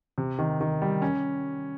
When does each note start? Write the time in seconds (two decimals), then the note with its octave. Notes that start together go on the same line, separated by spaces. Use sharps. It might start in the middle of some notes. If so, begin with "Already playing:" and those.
0.18 C3
0.39 D#3
0.61 D#3
0.82 G3
1.02 C#4